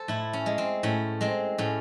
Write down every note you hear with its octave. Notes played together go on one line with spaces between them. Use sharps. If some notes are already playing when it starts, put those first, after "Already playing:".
Already playing: A4 C5
A2 E4
C#4
G#3
C4
A2 C#4
G#3 C4
A2 C#4